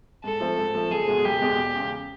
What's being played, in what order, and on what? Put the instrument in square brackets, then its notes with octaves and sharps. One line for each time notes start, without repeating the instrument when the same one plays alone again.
[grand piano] G#2 [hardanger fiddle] A4
[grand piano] F3 A3 C4
G#2
F3 A3 C4
[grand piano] F#1 [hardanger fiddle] G#4
[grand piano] E2 B2 G#3
[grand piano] F#1 [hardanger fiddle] G4
[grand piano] E2 B2 G#3
E1
E2 C#3